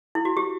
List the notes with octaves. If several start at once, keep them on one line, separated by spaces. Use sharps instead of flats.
E4
F#4
G4